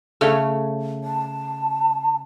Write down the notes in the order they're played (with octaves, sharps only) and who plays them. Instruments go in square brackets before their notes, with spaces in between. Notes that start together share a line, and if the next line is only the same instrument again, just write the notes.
[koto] C#3 A3 C#5
[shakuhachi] A5